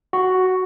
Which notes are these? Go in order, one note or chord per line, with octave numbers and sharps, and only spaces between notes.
F#4